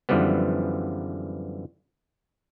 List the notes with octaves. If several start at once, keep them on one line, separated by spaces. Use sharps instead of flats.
F#2 D3 E3 F3 G3 B3